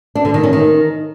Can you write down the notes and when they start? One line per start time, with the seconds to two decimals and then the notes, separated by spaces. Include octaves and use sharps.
0.15 D4
0.25 D3
0.34 D#3
0.43 C#4
0.53 D#3